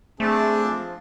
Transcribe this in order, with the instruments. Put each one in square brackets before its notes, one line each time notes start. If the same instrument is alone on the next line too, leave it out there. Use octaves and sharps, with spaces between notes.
[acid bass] A3 [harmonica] C4 D4 A5 [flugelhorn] G#4
[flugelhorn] F3